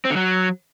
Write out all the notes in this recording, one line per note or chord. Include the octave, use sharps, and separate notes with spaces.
C4
D3
F#3